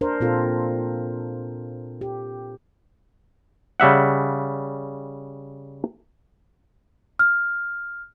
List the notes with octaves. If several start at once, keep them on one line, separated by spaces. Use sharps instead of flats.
D4 A#4 C5
A#2 C4 F4 A4
G4
C#3 G3 E5 F#5
F6